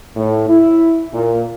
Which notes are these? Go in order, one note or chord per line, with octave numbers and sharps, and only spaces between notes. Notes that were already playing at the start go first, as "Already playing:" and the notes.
A2
E4
A#2